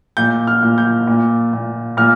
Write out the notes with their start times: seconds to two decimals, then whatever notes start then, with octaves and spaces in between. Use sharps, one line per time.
0.17 A#2 G6
0.47 F6
0.63 A#2
0.78 G6
1.07 A#2
1.53 A#2
1.97 A#2 F6